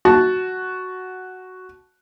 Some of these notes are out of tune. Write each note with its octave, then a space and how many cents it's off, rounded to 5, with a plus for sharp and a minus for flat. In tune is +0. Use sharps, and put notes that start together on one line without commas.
F#4 +0 A5 -10